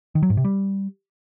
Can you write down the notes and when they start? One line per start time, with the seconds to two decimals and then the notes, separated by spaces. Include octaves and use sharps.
0.15 D#3
0.23 F#3
0.30 G#2
0.37 C3
0.45 G3